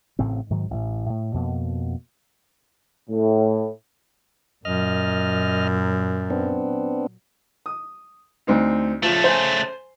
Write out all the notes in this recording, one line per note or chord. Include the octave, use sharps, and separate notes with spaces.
A1 A2 C#3 C4
G#2 D#3 F#3
A1 A2
A2
F2 B2 A#3
A2
F#2 A#2 F#3 D#5 F6
B3 C4 D4
D#6
D2 C4 D#4
C#3 F3 A3
C5 G#5